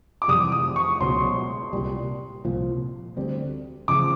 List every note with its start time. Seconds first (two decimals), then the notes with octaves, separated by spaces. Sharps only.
0.22 D6
0.28 F2 C3 E3 G3 D#6
0.52 D#6
0.76 C#6
1.01 C#2 B2 F#3 C6
1.73 C2 A#2 G3
2.45 C2 A#2 F3
3.17 D2 D3 G3 C4
3.88 E2 C#3 F3 D6